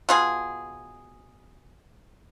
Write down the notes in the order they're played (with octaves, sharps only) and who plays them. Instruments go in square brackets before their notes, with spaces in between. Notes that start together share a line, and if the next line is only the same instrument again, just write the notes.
[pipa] B2 F4 G#4